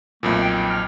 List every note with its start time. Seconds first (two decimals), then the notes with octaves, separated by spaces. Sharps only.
0.23 B1 F2 A#2 A3
0.41 G5
0.70 F6